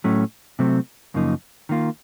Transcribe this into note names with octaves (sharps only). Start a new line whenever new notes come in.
A2 F#3 A3 C#4
C3 F#3 A3 C4
F#2 C#3 F3 A#3 D#4
D#3 A#3 F4